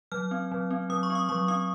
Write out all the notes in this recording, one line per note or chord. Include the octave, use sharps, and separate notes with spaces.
F#3 F6
C4
F#3
C4
F#3 D#6
C#6
C4
D#6
F#3 C#6
C4 D#6